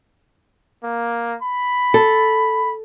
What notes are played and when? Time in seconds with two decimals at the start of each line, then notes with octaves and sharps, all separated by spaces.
0.84 A#3
1.43 B5
1.94 A4